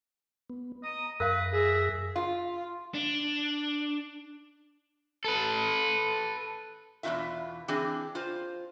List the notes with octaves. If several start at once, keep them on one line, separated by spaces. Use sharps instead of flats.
B3
D#5 A#5
F#2 A#4 B4 F5 A#6
G#4 E5
F4
D4
A4 B4
E2 B2 G#3 D#4 F4 E5
E3 C4 D4 G#4
F4 C5